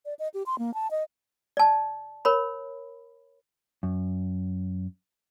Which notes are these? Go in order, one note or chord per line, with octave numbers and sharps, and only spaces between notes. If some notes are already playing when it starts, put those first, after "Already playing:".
D5
D#5
G4
C6
A#3
A5
D#5
D5 A5
A#4 C#5 B5
F#2